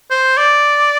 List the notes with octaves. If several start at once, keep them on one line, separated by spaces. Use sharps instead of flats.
C5
D5